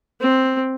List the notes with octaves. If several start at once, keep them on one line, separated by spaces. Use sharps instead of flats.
C4